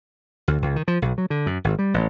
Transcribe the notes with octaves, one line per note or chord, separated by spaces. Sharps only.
D2
C#2
D#3
F3
B1
F#3
D3
F#2
G#1
G3
A1